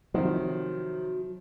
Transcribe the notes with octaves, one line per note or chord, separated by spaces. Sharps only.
C3 D#3 F3 F#3